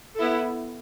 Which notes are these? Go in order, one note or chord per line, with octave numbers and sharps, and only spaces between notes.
B3 E4 A4